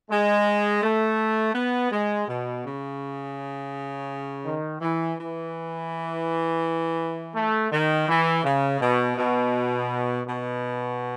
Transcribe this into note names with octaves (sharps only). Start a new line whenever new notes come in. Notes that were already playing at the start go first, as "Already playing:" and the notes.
G#3
A3
B3
G#3
B2
C#3
D#3
E3
E3
A3
D#3
E3
C#3
B2
B2
B2